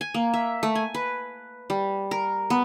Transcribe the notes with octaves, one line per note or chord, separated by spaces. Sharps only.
G#5
A#3
E5
A3
G#5
B4
G3
A#4
B3